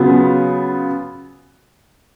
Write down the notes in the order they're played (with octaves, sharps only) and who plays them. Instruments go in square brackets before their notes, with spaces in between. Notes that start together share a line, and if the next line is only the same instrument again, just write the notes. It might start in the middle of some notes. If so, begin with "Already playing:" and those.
Already playing: [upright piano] C#3 F#3 B3 F4